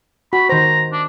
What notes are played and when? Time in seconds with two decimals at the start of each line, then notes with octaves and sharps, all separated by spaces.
0.33 F#4 B5
0.49 D#3 C5 A#5
0.92 D4